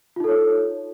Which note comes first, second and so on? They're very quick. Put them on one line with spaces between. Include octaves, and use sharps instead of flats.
F4 D#4 A4 C#5